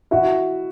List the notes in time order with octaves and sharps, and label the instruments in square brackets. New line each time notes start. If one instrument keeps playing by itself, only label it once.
[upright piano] E4 F#4